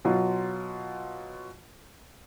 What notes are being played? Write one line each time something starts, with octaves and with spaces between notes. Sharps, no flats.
B2 F#3 F4